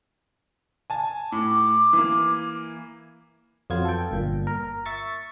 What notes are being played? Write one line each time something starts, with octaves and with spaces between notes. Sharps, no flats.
G#5 A5
A2 D6
E3 A#3
F2 F#3 B3 F4 G#6
A4 G5
G1 A#2
A#4
E5 C#6 A6